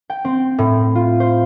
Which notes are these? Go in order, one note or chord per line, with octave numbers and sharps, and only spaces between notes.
G5
C4
A2
F4
C5